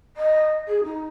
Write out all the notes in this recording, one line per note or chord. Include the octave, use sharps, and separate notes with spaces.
D#5
G#4
D#4